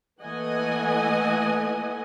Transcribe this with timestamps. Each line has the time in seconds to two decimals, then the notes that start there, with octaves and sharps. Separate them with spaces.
0.22 E3 A3 A#3 D#5 F#5 G#5